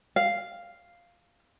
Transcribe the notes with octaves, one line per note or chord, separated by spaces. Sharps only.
F5